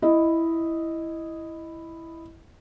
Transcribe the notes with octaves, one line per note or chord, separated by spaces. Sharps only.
E4 D#5